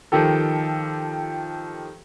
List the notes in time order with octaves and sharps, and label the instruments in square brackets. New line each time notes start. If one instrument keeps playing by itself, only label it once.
[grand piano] D#3 F3 G4 A4